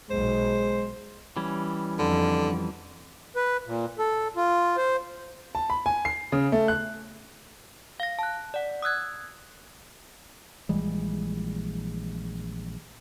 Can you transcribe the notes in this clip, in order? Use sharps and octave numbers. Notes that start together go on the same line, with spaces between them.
B1 G#3 C5
E3 G3 C#4
F2 D3
B4
A#2
A4
F4
C5
A5
B5
G#5
C7
C#3
A3
F#6
F5 A#6
A5 F#6
D5 F#5
D#6 E6 F#6 G#6
A#1 E3 G3 G#3